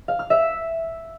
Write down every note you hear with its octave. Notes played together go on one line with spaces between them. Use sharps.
F5
F6
E5